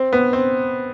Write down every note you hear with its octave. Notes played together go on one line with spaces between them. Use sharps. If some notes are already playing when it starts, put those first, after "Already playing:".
Already playing: C4
B3
C4